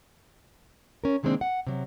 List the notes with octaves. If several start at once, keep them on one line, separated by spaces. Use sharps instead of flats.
C#4 A#4
C3 D#3 G#3 A#3 C4 D4
F#5
C3 F#3